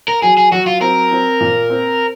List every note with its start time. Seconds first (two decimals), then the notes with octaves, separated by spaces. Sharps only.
0.08 A#4
0.22 F#3 G#4
0.37 G#4
0.51 F#3 F#4
0.67 F4
0.81 C4 A#4
1.11 C4
1.41 A#2
1.70 C4